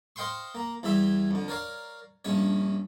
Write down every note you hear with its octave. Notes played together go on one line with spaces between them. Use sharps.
C5 D#5 F5 G5 C6 C#6
A#3 A#5
E2 E3 G3 G4 E5
F2 D3
A#4 C#5 D5 F5
A#1 G2 C#4 C#5